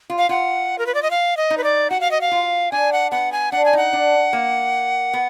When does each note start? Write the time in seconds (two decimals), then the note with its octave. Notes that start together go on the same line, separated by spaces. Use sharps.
0.10 F4
0.18 F5
0.29 F4 F#5
0.79 A#4
0.86 B4
0.95 D5
1.03 D#5
1.11 F5
1.37 D#5
1.50 D#4
1.58 B4
1.64 D5
1.90 F#4 F#5
2.01 F5
2.11 D#5
2.21 F5
2.31 F4
2.72 D4 G#5
2.93 F#5
3.12 B3 F#5
3.32 G#5
3.52 D4 F#5
3.65 G#5
3.73 D#4 F#5
3.93 D4
4.33 A#3
5.14 B3